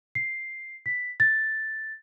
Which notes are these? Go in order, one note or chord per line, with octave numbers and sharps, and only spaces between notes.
C7
B6
A6